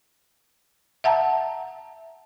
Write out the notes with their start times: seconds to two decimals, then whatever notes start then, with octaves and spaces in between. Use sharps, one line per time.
1.04 E5 F#5 A5 A#5